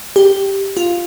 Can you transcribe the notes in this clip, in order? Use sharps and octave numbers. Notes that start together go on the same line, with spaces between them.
G4
F4